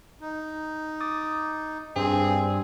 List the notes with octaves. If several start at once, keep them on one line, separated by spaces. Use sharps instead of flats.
D#4
D6 D#6 A6
G2 C4 G#4 C5